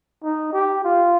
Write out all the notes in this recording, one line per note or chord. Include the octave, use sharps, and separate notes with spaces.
D#4
G4
F4